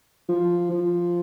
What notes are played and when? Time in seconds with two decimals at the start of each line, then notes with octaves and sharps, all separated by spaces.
0.29 F3
0.70 F3